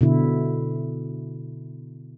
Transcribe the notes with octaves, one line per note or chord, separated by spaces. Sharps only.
B2 D3 E4